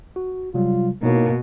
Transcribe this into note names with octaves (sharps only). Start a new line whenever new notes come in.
F#4
C3 F#3 G3 F4
B2 A#3 D#4 E4 C#5